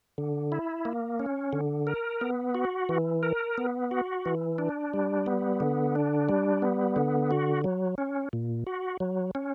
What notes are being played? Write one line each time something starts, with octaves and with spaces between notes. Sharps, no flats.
D3
E4
A#3
C#4
D3
A#4
B3
F#4
E3
A#4
B3
F#4
E3
D4
G3
B3
D3
D4
G3
B3
D3
F#4
F#3
C#4
A#2
F#4
F#3
C#4